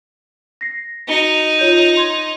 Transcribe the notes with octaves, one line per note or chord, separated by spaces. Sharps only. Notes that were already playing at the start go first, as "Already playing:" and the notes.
A#6 C7
D#4 F#4 C#7 G7
F4 C#5 G6
C6 G#6